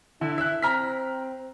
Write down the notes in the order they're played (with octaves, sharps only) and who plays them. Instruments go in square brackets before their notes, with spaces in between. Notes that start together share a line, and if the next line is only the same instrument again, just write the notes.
[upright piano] D3 [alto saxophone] E4
[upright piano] E5 F#6
[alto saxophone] C4 [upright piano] A#5 F6 B6